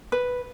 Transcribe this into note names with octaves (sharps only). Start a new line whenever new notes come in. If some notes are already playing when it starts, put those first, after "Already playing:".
B4